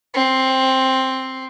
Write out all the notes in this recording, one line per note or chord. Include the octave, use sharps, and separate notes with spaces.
C4